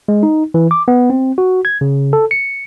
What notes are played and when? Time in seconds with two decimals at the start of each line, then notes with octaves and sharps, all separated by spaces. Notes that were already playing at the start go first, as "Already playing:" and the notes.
0.08 G#3
0.23 D#4
0.54 E3
0.71 D6
0.88 B3
1.10 C4
1.38 F#4
1.65 G#6
1.81 C#3
2.13 A4
2.31 C#7